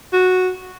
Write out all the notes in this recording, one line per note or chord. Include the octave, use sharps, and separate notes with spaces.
F#4